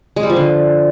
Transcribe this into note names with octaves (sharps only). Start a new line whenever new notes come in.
G#3
G3
F3
D3